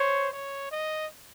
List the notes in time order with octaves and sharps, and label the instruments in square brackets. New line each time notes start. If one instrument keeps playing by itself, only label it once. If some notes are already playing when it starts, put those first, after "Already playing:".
Already playing: [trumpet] C5 [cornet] C#5
[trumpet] C#5
D#5